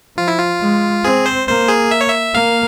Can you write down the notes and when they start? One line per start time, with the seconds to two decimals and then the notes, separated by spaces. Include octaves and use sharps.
0.17 F3 F4
0.28 E4
0.39 F4
0.60 G#3
1.04 C4 G#4
1.26 C5
1.47 A#3 C5
1.68 G#4
1.91 E5
2.01 C#5
2.09 E5
2.34 A#3 F5